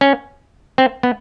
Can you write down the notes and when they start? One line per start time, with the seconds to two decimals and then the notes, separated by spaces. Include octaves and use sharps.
0.01 C#4
0.78 C4
1.03 B3